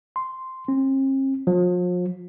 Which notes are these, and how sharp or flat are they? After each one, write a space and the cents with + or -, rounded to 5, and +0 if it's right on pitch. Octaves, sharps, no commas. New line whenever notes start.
C6 -5
C4 +45
F3 +40